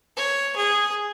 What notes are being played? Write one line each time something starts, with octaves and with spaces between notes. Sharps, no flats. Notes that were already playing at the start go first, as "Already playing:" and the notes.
C#5
G#4